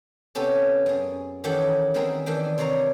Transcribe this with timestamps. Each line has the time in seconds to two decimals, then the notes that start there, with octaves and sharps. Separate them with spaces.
0.35 C3 B3 C#4 G4 A4
0.86 F#2 G#4
1.44 D#3 E3 C#4 G4 A4 F#5
1.94 D#3 B3 C4 E4 G#4 A#4
2.26 D#3 E3 D4 G5
2.58 C3 C#5 D5 F5 A#5